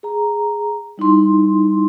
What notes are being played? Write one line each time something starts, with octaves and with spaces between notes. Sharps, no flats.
G#4 A#5
G3 D#4 E4 C6